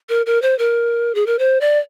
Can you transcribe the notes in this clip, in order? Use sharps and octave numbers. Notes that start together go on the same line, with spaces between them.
A#4
A#4
C5
A#4
G#4
A#4
C5
D5